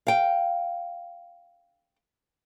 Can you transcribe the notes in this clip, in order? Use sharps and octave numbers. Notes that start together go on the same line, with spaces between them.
F5 G5